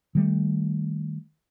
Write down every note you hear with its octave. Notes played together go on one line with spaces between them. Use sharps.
D#3 G3 A3